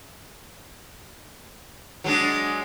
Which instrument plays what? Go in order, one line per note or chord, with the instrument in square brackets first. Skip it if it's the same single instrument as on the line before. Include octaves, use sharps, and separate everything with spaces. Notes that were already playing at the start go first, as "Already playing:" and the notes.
[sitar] F#3 G#3 D4